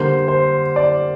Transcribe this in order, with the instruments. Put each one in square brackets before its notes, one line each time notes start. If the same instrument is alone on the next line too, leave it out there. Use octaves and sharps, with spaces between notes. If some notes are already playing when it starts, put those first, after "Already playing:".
Already playing: [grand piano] D3 G3 A#3 C5
C5
D5